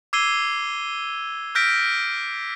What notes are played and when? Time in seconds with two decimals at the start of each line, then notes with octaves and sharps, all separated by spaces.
0.13 D6 E6 G#6 C7 D#7 G7
1.55 E6 F6 G6 A#6 B6 D7